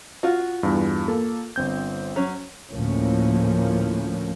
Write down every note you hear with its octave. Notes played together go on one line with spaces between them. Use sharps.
F4 F#4
E2 G2
A#3 A4
G1 C4 G6
F#3 C#4
D2 A2 F3 A#3 C#4